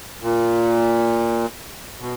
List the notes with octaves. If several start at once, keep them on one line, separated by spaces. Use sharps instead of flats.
A#2
B2